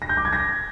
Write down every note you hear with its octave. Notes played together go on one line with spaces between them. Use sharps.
A#6
G6
D6
G#6
A#6